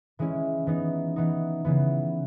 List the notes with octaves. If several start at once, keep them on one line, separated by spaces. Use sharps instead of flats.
E3 G#3 C#4 E4
E3 B3 D#4
E3 B3 D#4
C#3 E3 B3